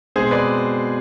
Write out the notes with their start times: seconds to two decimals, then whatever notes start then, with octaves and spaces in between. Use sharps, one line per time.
0.16 B2 G#3 C4 G#4 C5
0.31 B4 D5